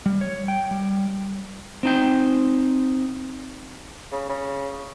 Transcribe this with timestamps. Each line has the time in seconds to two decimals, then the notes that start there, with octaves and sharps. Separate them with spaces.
0.06 G3
0.21 C#5
0.48 G5
0.71 G3
1.83 C4 D#4 G5
4.12 C#3
4.29 C#3